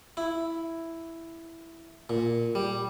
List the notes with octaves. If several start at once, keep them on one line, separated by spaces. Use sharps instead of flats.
E4
A#2
G3